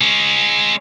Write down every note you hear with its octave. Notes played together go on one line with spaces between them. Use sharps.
G#3 C#4